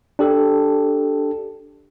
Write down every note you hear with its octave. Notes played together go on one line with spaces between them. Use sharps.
D4 G4 A4